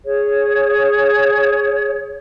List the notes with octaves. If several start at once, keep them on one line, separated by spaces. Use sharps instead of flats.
G#4 C#5